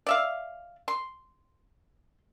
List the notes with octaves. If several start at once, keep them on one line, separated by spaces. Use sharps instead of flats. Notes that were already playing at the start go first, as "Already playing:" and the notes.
D5 E5 F5
C6